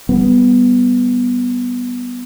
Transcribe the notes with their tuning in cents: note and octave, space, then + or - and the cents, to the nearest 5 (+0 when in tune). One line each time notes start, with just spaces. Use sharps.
G3 +0 B3 +0